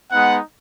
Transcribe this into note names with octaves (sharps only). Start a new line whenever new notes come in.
G#3 B3 D#4 F#5